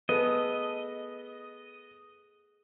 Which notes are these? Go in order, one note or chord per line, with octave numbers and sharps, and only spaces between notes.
B3 G#4 A4 D#5